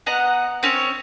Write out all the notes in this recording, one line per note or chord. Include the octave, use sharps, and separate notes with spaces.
B3 D#5 F#5 A#5
C4 C#4 C#5